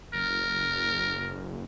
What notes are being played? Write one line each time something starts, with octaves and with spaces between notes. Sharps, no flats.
F#1 A#4